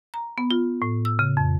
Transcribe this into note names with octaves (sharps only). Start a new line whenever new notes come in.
A#5
B3
F4
A2
E6
C#3
F2